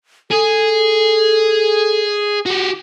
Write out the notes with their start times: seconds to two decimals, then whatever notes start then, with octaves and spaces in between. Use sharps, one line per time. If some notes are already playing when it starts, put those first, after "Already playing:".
0.31 G#4 A4
2.46 F#4 G4